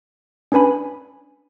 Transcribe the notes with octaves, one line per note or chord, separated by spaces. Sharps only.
C#4 D4 B4 G#5 B5